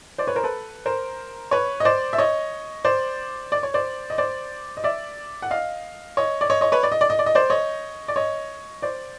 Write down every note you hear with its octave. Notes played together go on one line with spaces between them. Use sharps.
C5 D5
B4 C#5
A#4 C5
A4 B4
A#4 C5
B4 C#5
D#5
C5 D5
E5
C#5 D#5
C5 D5
D5
C#5
C5 D5
D#5
C5 D5
D#5
D5 E5
F#5
D#5 F5
C#5 D#5
D5
C#5 D#5
C#5 D#5
B4 C#5
D5
D#5
D5
D#5
D5
D#5
C5 D5
C#5 D#5
D5
C#5 D#5
C5 D5